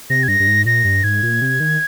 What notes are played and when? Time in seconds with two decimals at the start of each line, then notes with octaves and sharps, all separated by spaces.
0.10 C3 A#6
0.23 G#6
0.28 G2 A#6
0.40 G2
0.47 G#2
0.65 A#2 A#6
0.84 G2
1.04 G#2 G#6
1.23 A#2
1.42 C3
1.60 D#3